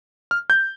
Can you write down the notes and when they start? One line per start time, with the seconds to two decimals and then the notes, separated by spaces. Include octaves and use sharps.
0.31 F6
0.50 G6